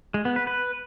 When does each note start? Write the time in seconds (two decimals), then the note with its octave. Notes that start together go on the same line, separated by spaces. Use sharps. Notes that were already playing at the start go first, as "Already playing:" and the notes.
0.14 G#3
0.25 B3
0.36 B4
0.47 B4